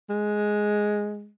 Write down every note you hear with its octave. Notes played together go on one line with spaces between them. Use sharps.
G#3